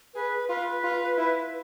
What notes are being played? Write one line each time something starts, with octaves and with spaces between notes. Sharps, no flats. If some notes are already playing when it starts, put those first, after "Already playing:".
G#4 B4
F4 B4
F4
E4